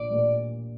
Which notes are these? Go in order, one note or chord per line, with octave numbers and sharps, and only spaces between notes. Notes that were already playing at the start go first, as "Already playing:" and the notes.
Already playing: A#1 D5
A#2 G3